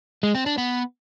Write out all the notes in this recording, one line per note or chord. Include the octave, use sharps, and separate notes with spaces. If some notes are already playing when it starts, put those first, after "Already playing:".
G#3
C4
D4
B3